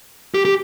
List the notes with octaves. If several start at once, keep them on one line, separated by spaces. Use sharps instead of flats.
G4
G4